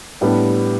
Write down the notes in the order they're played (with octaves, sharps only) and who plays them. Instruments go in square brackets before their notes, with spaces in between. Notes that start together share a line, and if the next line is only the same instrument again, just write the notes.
[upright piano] A2 G3 B3 D4 G4